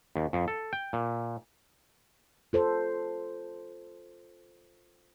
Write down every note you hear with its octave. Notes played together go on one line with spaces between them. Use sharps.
D#2
F2
A4
G5
A#2
F4 A4 C5